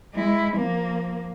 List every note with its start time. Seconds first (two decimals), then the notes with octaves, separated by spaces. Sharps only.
0.14 G#3 E4
0.56 F3 A#3